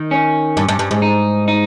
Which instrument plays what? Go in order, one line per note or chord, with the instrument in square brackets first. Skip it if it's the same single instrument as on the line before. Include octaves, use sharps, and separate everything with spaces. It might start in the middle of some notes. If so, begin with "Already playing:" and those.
Already playing: [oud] D#3
[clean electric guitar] C#4
[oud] G2
G2
G2
G#2
[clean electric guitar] D#4
D#4